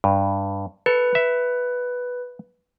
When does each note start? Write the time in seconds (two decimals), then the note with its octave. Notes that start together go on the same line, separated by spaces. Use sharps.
0.04 G2
0.86 A4 B4
1.15 E5